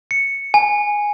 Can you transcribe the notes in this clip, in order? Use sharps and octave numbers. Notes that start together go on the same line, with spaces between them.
C#7
G#5